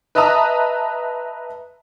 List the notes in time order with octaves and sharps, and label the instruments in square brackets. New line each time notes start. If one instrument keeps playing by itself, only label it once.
[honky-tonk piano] B4 D#5 E5 A5 A#5 D#6